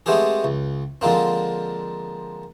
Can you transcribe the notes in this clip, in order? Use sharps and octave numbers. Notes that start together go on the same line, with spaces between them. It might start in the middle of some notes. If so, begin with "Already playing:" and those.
G#3 A3 B3 C4 G4 G#4
C#2
D3 F3 G#3 A#3 C4